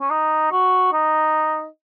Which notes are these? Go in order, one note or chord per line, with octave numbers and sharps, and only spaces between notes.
C#4
D#4
F#4
D#4